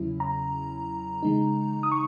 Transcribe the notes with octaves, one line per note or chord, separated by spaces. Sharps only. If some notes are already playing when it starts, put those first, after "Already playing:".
Already playing: E2 C#3 F#3 C#4 E4
A#5
C#3 E3 G#3 D#4
D#6
C#6